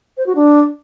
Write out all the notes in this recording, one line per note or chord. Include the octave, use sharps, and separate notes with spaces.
C5
F#4
D4